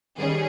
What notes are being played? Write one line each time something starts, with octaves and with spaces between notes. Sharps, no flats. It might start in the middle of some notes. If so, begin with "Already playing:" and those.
D#3 G3 C#4 G#4